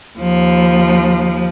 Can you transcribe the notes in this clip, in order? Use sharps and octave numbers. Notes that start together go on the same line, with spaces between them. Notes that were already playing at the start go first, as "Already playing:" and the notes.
D#2 F3